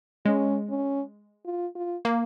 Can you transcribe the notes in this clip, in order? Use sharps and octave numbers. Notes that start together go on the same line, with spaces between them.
G#3 C#4
C#4
F4
F4
A#3